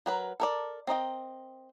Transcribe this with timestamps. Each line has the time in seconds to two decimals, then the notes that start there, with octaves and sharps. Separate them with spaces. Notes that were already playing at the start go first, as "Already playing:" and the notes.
0.06 F#3 A#4 B4
0.40 A4 A#4 D5
0.87 C4 A#4 D#5 G5